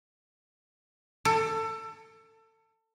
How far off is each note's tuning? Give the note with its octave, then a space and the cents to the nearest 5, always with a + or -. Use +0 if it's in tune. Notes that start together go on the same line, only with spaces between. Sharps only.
A4 +25